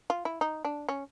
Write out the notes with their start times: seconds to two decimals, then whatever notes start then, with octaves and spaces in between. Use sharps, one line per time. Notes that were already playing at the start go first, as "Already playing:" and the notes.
0.10 F4
0.25 E4
0.41 D#4
0.65 D4
0.89 C#4